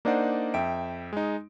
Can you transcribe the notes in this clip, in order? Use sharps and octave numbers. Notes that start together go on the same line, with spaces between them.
A#3 D4 D#4 C5 D5 F#5
F2 E5 G5 D7
G#3 D#4